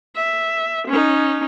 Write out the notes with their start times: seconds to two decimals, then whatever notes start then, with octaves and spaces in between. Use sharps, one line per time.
0.16 E5
0.88 C#4 D#4